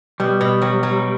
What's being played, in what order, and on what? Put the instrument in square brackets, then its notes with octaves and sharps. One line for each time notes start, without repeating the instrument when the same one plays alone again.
[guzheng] B2 [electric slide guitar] G3
[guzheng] B2
F#3
F#3